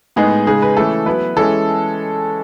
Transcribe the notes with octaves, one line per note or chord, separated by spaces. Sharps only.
A2 G#3 B3 D#4 G#4
C#3 G#3 D#4 G#4
B4
E3 A3 C#4 E4 A4
F#3 B3 E4 B4
E3 G#3 C#4 E4 A4